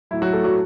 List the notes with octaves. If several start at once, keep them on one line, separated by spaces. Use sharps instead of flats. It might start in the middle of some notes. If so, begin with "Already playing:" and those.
A2 F#3 E4
F#3 F#4
A3 A4
F#3 F#4